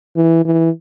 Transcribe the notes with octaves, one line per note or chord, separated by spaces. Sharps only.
E3
E3